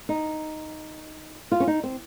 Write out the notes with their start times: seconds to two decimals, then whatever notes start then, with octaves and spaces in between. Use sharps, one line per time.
0.09 D#4
1.51 F4
1.60 C#4
1.67 D#4
1.83 C4